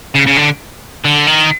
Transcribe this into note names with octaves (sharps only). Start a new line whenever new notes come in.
C#3
C#3
D3
D3
D#3